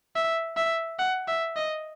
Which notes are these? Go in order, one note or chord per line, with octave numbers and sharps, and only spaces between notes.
E5
E5
F#5
E5
D#5